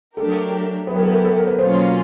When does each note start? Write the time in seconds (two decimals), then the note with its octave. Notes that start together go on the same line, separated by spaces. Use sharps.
0.16 F#3 A3 D4 G4 A4 A#4
0.87 F#3 B3 E4 G4 B4
0.96 A#4
1.03 A4
1.11 A#4
1.24 A4
1.37 A#4
1.47 B4
1.59 B2 F#3 A#3 C#4 F4 C5